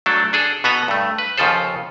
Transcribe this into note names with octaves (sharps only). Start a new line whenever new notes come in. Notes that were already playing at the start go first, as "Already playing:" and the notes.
F#3 A3 D4 A4
D4 G#4 A4
B2 B3 A4 B4 G#5 A#5
G2 A3
B4
D#2 C#3 F3 F4 A4 C5